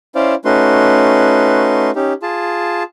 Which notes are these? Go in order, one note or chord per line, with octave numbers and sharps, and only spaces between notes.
C#4 E4 C5 D5 F5
A3 C#4 D#4 F#4 B4 C6
C#4 D#4 G4
F4 G#4 A5